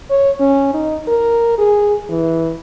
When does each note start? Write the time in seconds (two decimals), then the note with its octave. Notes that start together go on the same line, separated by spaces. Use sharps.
0.10 C#5
0.40 C#4
0.74 D#4
1.08 A#4
1.58 G#4
2.10 E3